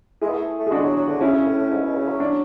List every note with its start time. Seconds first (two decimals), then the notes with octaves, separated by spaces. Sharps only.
0.21 G#3 E4 G#4
0.29 B3
0.34 A3
0.59 A3
0.67 G#4
0.71 G#3 D4 F#4
0.84 F#3
0.96 F#3
1.09 D3
1.21 C#3 C#4 E4
1.34 C#3
1.46 A2
1.58 A2
1.70 G#2
1.83 B2
1.95 C#3
2.08 F#3
2.20 D4